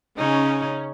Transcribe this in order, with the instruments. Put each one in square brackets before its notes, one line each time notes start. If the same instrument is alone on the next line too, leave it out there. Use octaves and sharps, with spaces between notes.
[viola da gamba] C#3 D#4 [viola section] C#4